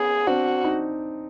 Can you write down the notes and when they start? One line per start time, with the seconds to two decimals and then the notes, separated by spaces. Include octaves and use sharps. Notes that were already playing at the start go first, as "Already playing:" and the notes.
Already playing: B3 C#4 G#4
0.27 C4 D4 F#4
0.64 D#4